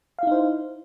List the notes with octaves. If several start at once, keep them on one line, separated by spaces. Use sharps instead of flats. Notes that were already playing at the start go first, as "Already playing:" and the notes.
D#4 E4 C5 F5